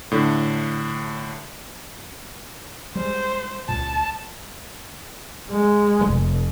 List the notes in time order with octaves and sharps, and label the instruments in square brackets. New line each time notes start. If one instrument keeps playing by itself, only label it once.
[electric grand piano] A2 D3
[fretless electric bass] G3 G#3 [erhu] C5
[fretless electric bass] C#2 A#2 [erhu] A5
[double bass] G#3
F1